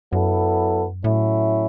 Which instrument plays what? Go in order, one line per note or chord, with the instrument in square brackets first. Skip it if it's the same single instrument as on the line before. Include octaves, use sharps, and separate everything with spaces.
[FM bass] F#2 [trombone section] F#3 B3 E4 A4
[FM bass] A2 [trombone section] F#3 A3 C#4 E4